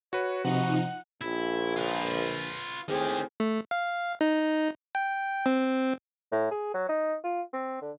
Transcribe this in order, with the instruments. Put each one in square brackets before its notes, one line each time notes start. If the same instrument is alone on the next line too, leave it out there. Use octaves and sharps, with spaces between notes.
[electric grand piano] F#4 B4 [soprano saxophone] C#5
[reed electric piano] C3 [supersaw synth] F3 D#4 [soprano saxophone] F#5
[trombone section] A#1 [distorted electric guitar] E4
[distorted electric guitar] F4 B4
[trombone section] A2 C4 G#4 [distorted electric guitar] D#3 G4
[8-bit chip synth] A3
F5
D#4
G5
C4
[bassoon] A2
G#4
F#3
D#4
F4
C4
D3